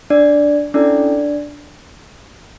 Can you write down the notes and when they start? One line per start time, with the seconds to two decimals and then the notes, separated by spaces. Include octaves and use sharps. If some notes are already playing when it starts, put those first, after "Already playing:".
0.10 D4 D5
0.74 C#4 D4 E4 A4 D5